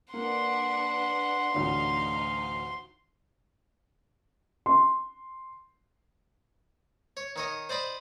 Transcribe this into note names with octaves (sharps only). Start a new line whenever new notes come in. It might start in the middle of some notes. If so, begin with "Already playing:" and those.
A#3 D4 B4 F#5 C6
A1 D2 D3 D#4 F5
C6
C#5
D#3 C#5 D#5
C5 D5 D#5 B5